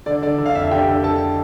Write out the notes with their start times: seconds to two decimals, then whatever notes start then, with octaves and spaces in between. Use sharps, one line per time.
0.06 D3 D5
0.22 D3 D5
0.38 D3
0.46 F5
0.55 F2 E5
0.71 D3 G4 G5
0.88 D3
1.03 D3 A4 A5